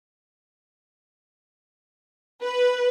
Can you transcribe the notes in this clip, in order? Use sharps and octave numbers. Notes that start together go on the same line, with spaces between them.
B4